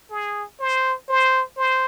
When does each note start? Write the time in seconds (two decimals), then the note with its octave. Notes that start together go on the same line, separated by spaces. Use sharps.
0.10 G#4
0.60 C5
1.08 C5
1.57 C5